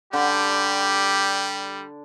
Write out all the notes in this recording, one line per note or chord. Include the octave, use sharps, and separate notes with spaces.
D3 G3 G4